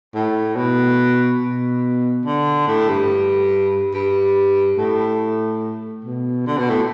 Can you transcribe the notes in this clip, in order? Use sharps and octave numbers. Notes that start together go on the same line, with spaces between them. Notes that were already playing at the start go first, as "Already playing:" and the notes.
A2
B2
B2
D3
A2
G2
G2
A2
B2
D3
B2
A2